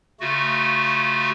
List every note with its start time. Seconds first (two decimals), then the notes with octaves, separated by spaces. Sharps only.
0.20 C#3 A3 F4 F#4